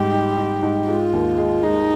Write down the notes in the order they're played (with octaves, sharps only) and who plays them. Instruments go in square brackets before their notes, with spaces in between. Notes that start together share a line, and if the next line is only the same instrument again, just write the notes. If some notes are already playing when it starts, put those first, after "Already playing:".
Already playing: [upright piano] G#2 G3 D#4 [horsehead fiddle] G4
[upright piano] D#4
D#4
G#2
[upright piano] G#3 [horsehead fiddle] F4
[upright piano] D#2
G#3
[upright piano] G#3 [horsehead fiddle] D#4